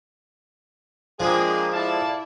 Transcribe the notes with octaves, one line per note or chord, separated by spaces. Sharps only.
F3 G#3 A#3 D4 G#4 D#5 G5
E4 A4 D5 F5 A5